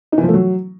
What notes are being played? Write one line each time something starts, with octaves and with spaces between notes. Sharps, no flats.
D#4
E3
F3
A3
F#3